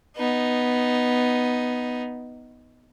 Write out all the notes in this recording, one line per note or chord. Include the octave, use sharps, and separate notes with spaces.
B3 D#4